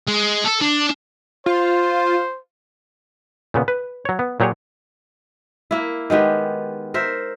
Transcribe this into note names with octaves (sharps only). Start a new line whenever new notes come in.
G#3
A4
D4
F4 C5
A#2 C#3 B3
B4
F#3 C#5
B3
A#2 F#3 G4 G#4 C#5
A#3 E4
D#3 G#3 B3 G4
A#4 C5 E5